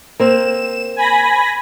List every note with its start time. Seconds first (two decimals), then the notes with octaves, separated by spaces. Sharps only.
0.20 A#3 C4 E7
0.96 G#5 B5 A#6